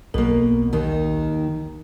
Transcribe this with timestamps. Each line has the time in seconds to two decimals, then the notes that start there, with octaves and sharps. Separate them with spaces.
0.14 B1 B2 A#3 A#4
0.73 D#2 D#3 D#4